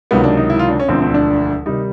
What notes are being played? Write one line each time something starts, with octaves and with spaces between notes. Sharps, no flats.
C#2 C3 D#3 F#3 B3
D4
D#4
E4
F4
D4
C#4
E1 D2 D3 F3 C4
C4
D4
C3 D#3 G3 D#4